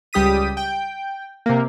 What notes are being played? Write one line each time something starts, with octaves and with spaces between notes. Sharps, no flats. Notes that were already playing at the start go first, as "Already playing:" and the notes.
C#2 G3 G4 D#6 B6 D#7
G5
C3 A#3